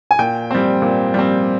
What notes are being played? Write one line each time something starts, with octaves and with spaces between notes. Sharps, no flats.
G#5
A#2 G5
G3 C4
A#2
G3 C4